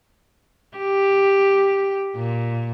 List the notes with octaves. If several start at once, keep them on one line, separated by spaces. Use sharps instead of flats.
G4
A#2